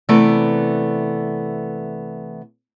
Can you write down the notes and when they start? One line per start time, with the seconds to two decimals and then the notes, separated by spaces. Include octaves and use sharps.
0.09 C3 E3 A3 B3 D5